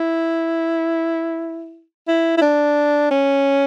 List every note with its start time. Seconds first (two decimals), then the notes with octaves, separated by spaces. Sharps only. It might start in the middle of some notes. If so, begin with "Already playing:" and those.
Already playing: E4
2.08 E4
2.38 E4
2.42 D4
3.11 C#4